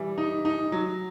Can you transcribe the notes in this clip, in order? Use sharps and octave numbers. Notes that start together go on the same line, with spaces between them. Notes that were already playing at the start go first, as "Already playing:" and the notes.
Already playing: E3 G3
D#4
D#4
F#3